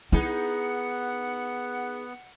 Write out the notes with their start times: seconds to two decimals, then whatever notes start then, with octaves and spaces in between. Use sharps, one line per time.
0.12 B3 D#4 E4 G#4 F#5